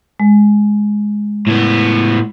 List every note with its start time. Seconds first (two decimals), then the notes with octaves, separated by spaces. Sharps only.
0.20 G#3
1.47 A2 B3